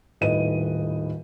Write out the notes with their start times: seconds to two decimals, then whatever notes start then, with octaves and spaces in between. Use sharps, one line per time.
0.21 D#1 A2 D#3 B4 D#5 D#7